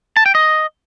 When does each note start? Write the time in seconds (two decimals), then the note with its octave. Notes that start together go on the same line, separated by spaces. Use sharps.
0.17 A5
0.26 G5
0.35 D#5